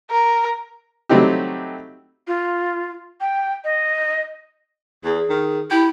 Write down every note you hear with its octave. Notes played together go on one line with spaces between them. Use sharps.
A#4
F#3 G3 A3 C4 D#4 G4
F4
G5
D#5
E2 G#4
D#3
E4 G4